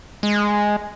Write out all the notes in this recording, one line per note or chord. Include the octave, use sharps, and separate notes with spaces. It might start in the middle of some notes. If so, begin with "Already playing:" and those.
G#3